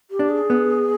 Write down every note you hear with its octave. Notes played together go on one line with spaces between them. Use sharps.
G4
D4
G#4
B3